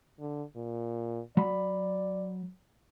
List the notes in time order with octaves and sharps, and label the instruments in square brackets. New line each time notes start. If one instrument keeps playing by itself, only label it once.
[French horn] D3
A#2
[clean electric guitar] F#3 B5 [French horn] D5